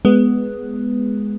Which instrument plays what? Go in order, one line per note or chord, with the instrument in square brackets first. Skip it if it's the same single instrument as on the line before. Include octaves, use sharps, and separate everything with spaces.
[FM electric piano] G#3 B3